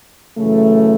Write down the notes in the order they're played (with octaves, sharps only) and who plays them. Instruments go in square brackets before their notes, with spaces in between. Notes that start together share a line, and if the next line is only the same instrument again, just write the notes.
[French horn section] F#2 C#3 E3 A3